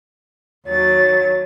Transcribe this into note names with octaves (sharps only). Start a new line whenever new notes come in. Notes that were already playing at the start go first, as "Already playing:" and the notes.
D#2 F#3 C#5 A6